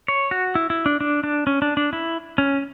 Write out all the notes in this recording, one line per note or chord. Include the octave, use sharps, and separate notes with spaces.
C#5
F#4
E4
E4
D4
D4
D4
C#4
D4
D4
E4
C#4